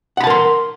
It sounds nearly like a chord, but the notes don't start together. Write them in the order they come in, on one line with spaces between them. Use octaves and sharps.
F#5 B5 A5 A#4 C6